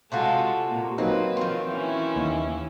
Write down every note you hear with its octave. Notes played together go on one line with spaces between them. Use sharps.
C3 G#3 F4 F#4 A4
A#2 A#3
F#3 A#3 C4 D#4 B4
D#3 F3 C4
E3 C#4 E4
D#2